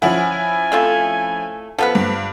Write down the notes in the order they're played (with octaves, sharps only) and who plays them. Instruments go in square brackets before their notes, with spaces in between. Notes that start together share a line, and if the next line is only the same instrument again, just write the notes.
[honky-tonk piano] F3 C#4 E4 [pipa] F#5 [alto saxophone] G#5
[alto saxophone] G#5
[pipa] A3 C4 F4
[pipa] F3 B3 B4 [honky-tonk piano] A4
[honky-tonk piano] G2